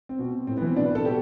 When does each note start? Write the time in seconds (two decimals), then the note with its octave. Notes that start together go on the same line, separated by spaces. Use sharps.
0.09 C4
0.19 B2
0.47 A2 C4
0.57 B3
0.62 E3 C4
0.76 B2 D4
0.86 B4
0.95 A4
1.05 B2 G4